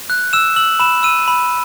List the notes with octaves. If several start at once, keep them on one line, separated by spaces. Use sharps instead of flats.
F#6
E6 E7
E6 F#7
B5 E7
E6 D#7
B5